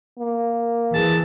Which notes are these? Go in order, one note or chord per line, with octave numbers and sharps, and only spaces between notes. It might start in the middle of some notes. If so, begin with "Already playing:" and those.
A#3
E3 G#4 A5